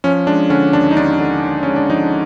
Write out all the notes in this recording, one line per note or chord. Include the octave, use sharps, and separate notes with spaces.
F3 C#4
G#3 D4
D3 C#4
D#2 D4
D#4
D#2 D4
D3
D#2
G#3 C#4
D4
F3 D#4